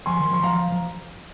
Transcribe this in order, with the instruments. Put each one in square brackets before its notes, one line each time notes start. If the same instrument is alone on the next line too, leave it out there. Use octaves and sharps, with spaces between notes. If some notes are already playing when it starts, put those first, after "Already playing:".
[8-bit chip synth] F3 [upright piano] G#5 C6
[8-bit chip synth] D#3
[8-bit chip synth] F3 [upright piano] C6
[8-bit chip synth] F3 [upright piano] F5 A#5
[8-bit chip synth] F3